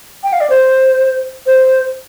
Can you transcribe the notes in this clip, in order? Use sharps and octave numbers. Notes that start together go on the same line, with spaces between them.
G5
F5
D5
C5
C5